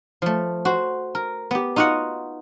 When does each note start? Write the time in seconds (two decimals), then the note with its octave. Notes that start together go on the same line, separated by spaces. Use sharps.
0.22 F3 A3
0.65 F#4 C5
1.15 A#4
1.51 B3 G4
1.76 D#4 F4 F#4 D#5 F#5